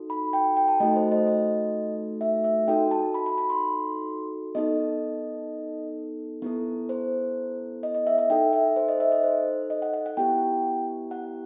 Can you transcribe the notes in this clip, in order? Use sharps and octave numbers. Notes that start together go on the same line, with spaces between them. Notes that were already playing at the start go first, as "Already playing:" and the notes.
Already playing: D#4 F#4 A4
B5
G5
G5
A5
A3 D#4 F#4 A4 D#5
C5
D#5
D#5
E5
E5
D#4 F#4 A4 G5
A5
B5
B5
B5
C6
B3 D#4 A4 D#5
B3 E4 A4
C5
D#5
D#5
E5
E5
D#4 A4 G5
E5
C5
D#5
E5
D#5
C5
D#5
F#5
F#5
F#5
B3 E4 G4 G5
F#5